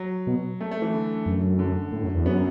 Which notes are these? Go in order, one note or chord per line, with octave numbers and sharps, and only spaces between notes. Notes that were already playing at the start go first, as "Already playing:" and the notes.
Already playing: F#3
B2
A3
A3
E3
D3
F#2
D3
A2
F#2
E2
F#2 B3